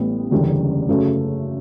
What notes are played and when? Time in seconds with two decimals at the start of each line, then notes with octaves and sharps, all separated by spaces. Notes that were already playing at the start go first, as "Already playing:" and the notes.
Already playing: A1 A2 G3 B3
0.31 F#1 E2 D3 G3 C#4
0.89 F#2 C#3 F#3 A3